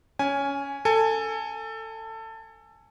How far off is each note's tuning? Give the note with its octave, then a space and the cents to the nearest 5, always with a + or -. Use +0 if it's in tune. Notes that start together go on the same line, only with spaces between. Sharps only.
C#4 +15 G#5 +0
A4 +20 G#5 +0